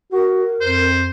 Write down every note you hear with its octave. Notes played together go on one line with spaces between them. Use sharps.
F#4 A#4
F2 C5